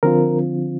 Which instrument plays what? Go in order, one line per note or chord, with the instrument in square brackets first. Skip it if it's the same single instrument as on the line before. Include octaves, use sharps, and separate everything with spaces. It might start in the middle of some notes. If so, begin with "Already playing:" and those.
[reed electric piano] D3 F3 C4 F4 A#4